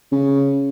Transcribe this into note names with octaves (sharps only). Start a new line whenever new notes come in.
C#3